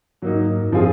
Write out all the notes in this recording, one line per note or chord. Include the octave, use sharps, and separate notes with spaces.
G#2 F#3 A#3 D#4
F#2
F3 C4 F4 G#4